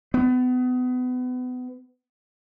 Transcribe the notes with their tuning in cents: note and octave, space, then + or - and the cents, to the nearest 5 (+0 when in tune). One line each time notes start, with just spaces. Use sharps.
B3 +30